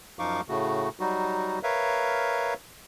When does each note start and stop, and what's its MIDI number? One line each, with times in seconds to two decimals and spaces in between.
0.19 0.41 42
0.19 0.41 53
0.19 0.41 63
0.19 0.41 77
0.19 0.41 85
0.19 0.41 86
0.49 0.89 45
0.49 0.89 49
0.49 0.89 57
0.49 0.89 66
1.00 1.59 54
1.00 1.59 55
1.00 1.59 63
1.00 1.59 66
1.63 2.54 70
1.63 2.54 71
1.63 2.54 73
1.63 2.54 76
1.63 2.54 77